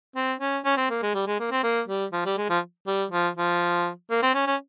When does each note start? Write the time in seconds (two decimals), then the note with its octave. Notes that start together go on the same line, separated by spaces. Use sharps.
0.16 C4
0.40 C#4
0.65 C#4
0.77 C4
0.90 A#3
1.02 G#3
1.14 G3
1.27 G#3
1.40 A#3
1.51 C4
1.63 A#3
1.88 G3
2.13 F3
2.26 G3
2.38 G#3
2.50 F3
2.87 G3
3.11 F3
3.37 F3
4.10 A#3
4.22 C4
4.34 C#4
4.47 C#4